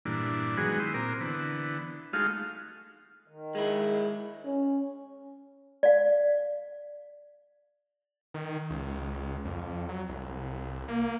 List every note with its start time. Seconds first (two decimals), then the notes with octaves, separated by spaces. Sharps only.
0.05 G2 A#2 E3 D4
0.57 D#3 F#3 G#3 B3 F#4 G#4
0.79 E4 G4 C6 D#6
0.94 A#2 C4 A#4 D6
1.21 D3 E3 B3
2.13 G#3 A3 D#4 F4 F#4 F5
3.28 D#3
3.55 G#3 E4
4.45 C#4
5.83 D5 F5
8.34 D#3
8.70 C#2
9.45 F2
9.89 F#3
10.09 C2
10.88 A#3